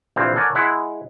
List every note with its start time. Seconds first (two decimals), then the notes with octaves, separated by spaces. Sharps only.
0.16 A#1 C3 E3 C4 C5 F5
0.36 A4 A#4 C#5 D5 F#5 G#5
0.55 G#3 E4 F#5